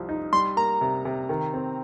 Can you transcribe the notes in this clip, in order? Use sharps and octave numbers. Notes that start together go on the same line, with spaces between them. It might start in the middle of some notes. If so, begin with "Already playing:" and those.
Already playing: C2 F3
D#4
G3 C6
A#3 A#5
C3
C3
D#3
C4